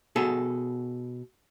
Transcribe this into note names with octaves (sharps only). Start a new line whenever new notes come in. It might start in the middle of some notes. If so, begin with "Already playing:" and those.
B2 G#4 A4